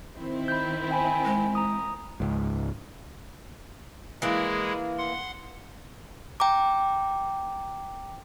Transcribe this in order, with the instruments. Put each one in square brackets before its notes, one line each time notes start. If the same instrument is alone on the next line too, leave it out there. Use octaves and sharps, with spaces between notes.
[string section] D#3 C4 E4
[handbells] B5 G6
G5 G#5 B5
[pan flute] G#3
[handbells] A#5 D#6
[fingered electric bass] C#2 G#2
[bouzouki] E3 A#3 [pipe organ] G#3 E4 G#4
[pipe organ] F#5 C6
[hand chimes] G5 A#5 D6